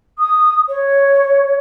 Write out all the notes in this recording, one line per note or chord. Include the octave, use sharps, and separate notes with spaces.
D#6
C#5